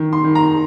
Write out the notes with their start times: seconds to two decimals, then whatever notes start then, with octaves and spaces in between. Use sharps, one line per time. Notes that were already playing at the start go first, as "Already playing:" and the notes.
Already playing: D#3
0.13 C6
0.24 D#3
0.35 A#5